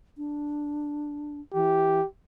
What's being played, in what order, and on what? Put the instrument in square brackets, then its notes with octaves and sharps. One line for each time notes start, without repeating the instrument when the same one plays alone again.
[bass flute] D4
[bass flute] E3 [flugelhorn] G4